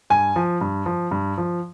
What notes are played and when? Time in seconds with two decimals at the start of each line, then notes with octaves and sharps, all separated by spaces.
0.10 G2 G#5
0.36 F3
0.61 G2
0.86 F3
1.11 G2
1.38 F3